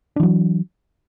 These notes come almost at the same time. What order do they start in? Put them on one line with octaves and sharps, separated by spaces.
D4 E3 F#3